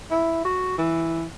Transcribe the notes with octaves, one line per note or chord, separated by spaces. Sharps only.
E4
F#4
E3